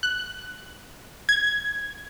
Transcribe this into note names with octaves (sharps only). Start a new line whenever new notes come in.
F#6
G#6